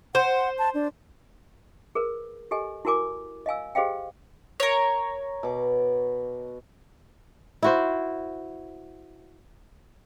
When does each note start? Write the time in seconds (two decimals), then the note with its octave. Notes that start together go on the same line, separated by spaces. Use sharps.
0.15 C5 F#5
0.59 A5
0.74 D4
1.95 G#4 A#4 B4
2.51 G4 A4 D#5 G#5
2.85 E4 F#4 A#4 G#5 D6
3.46 D#5 F5 G#5 E6
3.75 G4 G#4 C5 D#5 F5 G5
4.60 A#4 C#5
5.43 B2 D6
7.63 E4 F#4 C5